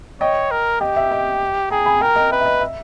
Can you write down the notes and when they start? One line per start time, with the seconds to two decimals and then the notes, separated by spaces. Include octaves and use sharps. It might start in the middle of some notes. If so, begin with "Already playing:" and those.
0.20 C#5 D#5 G5
0.51 A#4
0.81 G4 D#5 G5
0.96 E5
1.11 D#5 G5
1.70 G#4 G5 A#5
1.86 G#5 B5
2.01 A#4 G5 A#5
2.16 D#5 G5
2.31 B4 E5
2.41 E5
2.46 D#5
2.61 E5